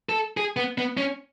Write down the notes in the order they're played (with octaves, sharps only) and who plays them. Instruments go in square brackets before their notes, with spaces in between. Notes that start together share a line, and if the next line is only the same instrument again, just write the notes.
[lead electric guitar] A4
G#4
B3
B3
C#4